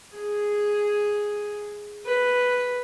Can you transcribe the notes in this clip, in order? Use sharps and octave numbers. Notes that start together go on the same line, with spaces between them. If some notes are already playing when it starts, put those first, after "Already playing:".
G#4
B4